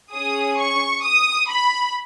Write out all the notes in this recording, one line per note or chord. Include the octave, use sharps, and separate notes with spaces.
C#4 G#4 D#6
C#6
D#6
B5